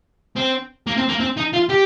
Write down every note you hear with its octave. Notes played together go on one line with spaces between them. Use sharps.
C4
A#3
C4
A#3
C4
D#4
F4
G4